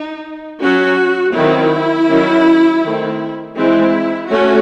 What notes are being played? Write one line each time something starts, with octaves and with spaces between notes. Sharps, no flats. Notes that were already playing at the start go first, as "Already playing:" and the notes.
Already playing: D#4
F#3 C#4 F#4
D#3 F#3 C4 E4
D#3 F#3 C#4
D#3 A3 C4
E3 G#3 C4 E4
A3 C#4 F#4